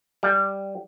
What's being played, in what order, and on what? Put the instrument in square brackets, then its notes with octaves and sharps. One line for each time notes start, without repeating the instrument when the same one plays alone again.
[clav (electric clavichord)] G3